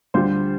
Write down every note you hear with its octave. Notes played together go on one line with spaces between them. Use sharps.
D2 D3 G3 F4 C5